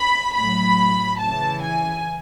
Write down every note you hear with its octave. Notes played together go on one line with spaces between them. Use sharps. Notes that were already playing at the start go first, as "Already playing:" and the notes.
Already playing: B5
A2 F#3 B5
C#3 E3 A5
G#5